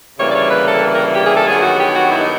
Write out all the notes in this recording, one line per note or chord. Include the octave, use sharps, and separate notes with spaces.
D2 C#3 E3 G3 A#3 C#5
D5
C#5
B4
A4
A#4
G4
G#4
A4
G2 D#3 F#3 B3 G#4
F#4
G4
F#4
E4
D#4